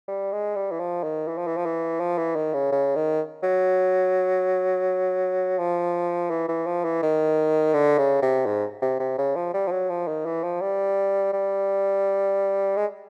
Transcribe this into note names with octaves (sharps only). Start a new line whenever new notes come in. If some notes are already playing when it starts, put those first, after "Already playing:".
G3
G#3
G3
E3
F3
D#3
E3
F3
E3
F3
E3
F3
E3
D#3
C#3
C#3
D#3
F#3
F3
E3
E3
F3
E3
D#3
D3
C#3
C3
G#2
C3
C3
C#3
F3
G3
F3
F#3
F3
D#3
E3
F3
G3
G3
G#3